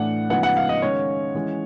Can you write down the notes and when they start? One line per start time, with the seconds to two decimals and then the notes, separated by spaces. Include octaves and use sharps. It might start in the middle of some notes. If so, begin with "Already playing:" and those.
Already playing: A2 E3 A3 D4 F#5
0.30 C#3 F3 G#3 B3 D#4 F#5
0.43 F#5
0.57 F5
0.69 D#5
0.82 D#3 G#3 C#4 C#5
1.35 E3 G#3 C#4